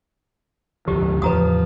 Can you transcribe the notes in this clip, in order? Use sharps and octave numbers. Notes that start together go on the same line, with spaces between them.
G#1 D2 D3 D#3 F3 G4
E2 A2 C#3 F3 B4 A#5 D#6